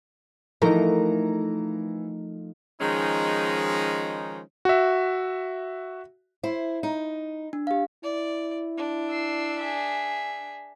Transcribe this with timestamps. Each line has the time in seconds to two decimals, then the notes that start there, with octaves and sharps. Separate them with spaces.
0.62 E3 F3 A3 D#4 A#4 A#5
2.81 D#3 F3 G#3 C#4 D#4
4.65 F#4 E5
6.43 E4 C5
6.83 D#4
7.53 D4
7.67 G4 F5
8.03 E4 D5
8.77 D4
9.10 E6 C7
9.60 G#4 E5